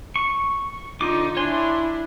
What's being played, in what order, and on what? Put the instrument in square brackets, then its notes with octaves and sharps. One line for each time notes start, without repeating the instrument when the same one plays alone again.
[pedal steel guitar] C#6
[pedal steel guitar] D3 F4 D6 [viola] D#4
[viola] D4 E4 [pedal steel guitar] C#5 G#5 C6